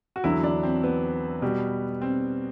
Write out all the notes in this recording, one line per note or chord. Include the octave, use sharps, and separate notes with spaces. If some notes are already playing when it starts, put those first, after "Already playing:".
F#4
E2 D3 F#3 E4
D4
C4
B3
B2 G3
C4